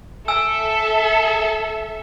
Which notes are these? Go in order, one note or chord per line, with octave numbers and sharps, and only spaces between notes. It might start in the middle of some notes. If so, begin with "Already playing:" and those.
A4 E5 G#5 E6